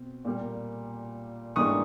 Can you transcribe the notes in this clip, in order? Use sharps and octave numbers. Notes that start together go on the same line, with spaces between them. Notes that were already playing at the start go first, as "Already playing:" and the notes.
Already playing: B2 C4
A#2 G3 A#3
G#2 E3 G3 A#3 D4 C#6 D#6